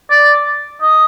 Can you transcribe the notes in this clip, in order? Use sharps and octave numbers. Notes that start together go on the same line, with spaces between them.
D5
D#5